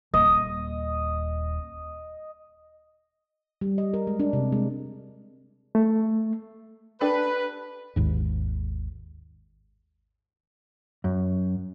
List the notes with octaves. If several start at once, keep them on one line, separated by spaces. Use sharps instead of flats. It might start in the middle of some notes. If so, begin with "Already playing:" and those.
D#1 D#5
G3
D#5
A#4
G#3
D4
C3
G#3
A3
D4 G4 A4 B4
G#1 D#2 G#2
F#2